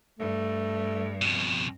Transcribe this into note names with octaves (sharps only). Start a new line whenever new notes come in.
G2 A3
F2 B2